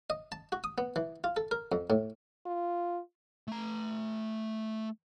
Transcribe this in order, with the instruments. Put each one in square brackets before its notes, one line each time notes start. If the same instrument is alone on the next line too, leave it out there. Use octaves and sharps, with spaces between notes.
[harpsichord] D#5
A5
F#4
D#6
B3
E3
F4
A4
A#4
F2
A2
[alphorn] F4
[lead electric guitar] A3 A#5